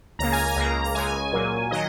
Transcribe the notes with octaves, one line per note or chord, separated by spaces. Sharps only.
C#2 C#3 A#3 A#5
G#5
A#5
C#2 C#3 A#3
A#5
C#2 C#3 G#3 G#5
A#2 F#3 A#3
D#3 F#3 D#5